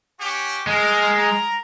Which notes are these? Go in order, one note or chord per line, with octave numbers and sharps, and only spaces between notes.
C#4 F#4 G4
G#3 A#4
A#4 A#5